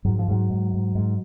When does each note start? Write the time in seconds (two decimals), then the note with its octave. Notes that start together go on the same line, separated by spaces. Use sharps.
0.05 G#2 F#3
0.19 F3
0.28 G#2 F#3
0.50 G#2
0.73 G#2
0.95 G#2